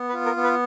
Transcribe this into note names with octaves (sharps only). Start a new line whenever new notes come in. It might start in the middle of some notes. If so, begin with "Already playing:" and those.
Already playing: B3
B4
F4
A#4
B3
B4